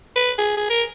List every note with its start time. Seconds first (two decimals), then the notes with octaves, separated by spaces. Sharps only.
0.16 B4
0.38 G#4
0.57 G#4
0.70 A#4